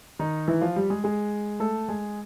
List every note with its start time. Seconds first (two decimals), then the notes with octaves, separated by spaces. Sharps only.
0.19 D#3 D#4
0.48 E3 E4
0.61 F3 F4
0.76 G3 G4
0.90 G#3 G#4
1.04 G#3 G#4
1.60 A3 A4
1.89 G#3 G#4